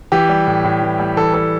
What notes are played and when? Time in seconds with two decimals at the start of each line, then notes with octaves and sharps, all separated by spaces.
0.12 E3 G4
0.29 G3
0.47 A2
0.64 A2
0.82 E3
0.99 G3
1.17 E3 A4
1.34 G3 A4